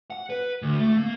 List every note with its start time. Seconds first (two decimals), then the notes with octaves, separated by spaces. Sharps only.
0.10 F#5
0.30 B4
0.62 D2
0.79 A3
0.97 A#3